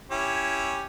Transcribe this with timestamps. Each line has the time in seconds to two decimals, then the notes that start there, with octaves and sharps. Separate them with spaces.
0.11 C#4 E4 G4